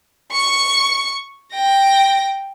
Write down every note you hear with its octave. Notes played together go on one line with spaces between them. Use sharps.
C#6 C#7
G5 A#6